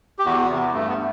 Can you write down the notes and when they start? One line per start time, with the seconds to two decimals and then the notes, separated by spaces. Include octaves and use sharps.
0.19 G4
0.25 E2 F#4
0.49 C3 E3 B3
0.73 G2 A3
0.89 B3